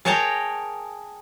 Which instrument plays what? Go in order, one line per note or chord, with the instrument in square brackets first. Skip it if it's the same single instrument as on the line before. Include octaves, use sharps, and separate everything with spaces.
[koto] G#4 A#4 C#5 G5 A5 A#5